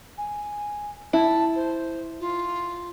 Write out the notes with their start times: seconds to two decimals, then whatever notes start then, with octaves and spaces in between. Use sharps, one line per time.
0.18 G#5
1.13 E4 A5
1.55 C5
2.20 F4